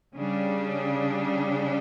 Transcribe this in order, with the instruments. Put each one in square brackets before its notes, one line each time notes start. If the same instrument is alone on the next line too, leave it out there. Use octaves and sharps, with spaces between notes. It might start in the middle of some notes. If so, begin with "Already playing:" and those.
[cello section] C#3 G3 D4